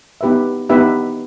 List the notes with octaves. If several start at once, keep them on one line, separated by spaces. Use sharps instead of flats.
B3 D#4 G4 B4 E5
B3 D#4 G4 B4 E5